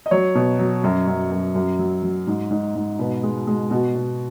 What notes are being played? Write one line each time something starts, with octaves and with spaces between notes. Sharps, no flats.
D#5
F#3 C#5
B2
F#3
F#2
F#2
F#2
F#2
F#3
F#3
G#2
G#2
G#2
B2 B4
G#3
G#3
B2 F#4
B2